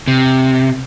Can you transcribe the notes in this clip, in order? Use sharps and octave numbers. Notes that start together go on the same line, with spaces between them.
C3